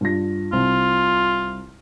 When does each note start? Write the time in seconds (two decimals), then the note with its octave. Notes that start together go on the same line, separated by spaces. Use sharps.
0.01 G2 F4 A#6
0.53 C2 C4 F4